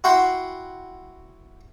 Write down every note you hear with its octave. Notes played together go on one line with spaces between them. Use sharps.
E4 F#4 F#5 G5 B5 C6